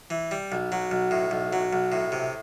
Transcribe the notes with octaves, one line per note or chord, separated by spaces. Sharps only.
E3
G3
B1
F#3
B1
A2
B1
F#3
B1
A2
C3